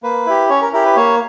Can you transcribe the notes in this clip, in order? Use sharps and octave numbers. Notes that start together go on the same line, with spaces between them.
A#3 B4
E4 G4
C#4 C#5
A#4
E4 G4 A#4
B4
A#3 C#5